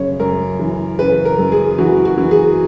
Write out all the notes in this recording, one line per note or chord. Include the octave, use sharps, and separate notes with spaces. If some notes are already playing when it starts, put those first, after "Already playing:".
Already playing: F#2 C#3 C#5
F#2 A#4
E3
C#3 B4
A#4
F#2
G#4
E3 F#4
F#4
E3
G#4